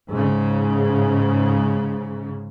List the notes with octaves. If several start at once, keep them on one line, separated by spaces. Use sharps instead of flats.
G#2 C#3